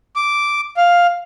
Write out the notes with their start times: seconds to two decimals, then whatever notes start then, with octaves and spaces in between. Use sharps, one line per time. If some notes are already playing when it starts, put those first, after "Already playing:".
0.16 D6
0.77 F5